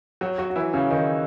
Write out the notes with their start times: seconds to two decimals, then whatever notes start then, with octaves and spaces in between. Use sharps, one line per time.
0.21 F#3 F#4
0.38 F#3 F#4
0.50 F#4
0.56 E3 E4
0.73 C#3 C#4
0.90 D#3 D#4